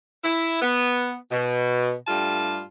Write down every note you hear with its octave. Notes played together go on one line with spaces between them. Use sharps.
E4
B3
B2
G2 G3 A3 F4 A5